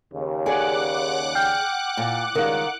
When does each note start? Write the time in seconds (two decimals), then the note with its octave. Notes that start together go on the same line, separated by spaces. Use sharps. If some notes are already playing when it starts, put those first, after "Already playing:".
0.13 D#2 C#3
0.46 G#4 D5 F#5 D6 F#6
1.35 G5 F6 G6
1.97 A#2
2.35 C#2 D#3 G3 A#4 F5